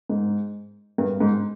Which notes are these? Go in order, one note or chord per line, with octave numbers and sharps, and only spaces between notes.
G#2
G2
G#2